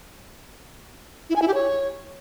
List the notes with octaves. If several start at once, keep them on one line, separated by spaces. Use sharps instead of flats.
E4
G#5
E4
G4
C#5